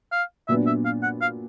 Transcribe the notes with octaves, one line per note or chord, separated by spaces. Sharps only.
F5
A#2 F#3 B3 D4 E5
E5
F5
F#5
F5